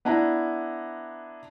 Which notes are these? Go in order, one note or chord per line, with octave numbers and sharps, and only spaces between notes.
B3 D4 E4 A#5